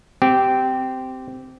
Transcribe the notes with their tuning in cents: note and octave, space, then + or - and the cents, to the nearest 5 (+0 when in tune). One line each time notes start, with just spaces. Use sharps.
C4 -15 G4 -10